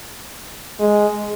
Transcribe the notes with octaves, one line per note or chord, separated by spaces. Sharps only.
G#3